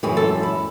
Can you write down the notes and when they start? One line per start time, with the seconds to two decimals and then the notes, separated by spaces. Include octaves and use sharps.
0.03 F#2 E3 G#3 G#4
0.17 A4
0.43 E4